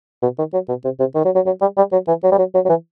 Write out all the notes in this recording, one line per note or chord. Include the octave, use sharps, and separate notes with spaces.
B2
D#3
F#3
B2
C3
C3
D#3
F#3
F#3
F#3
G3
G3
F#3
E3
F#3
G3
F#3
F#3
F#3
E3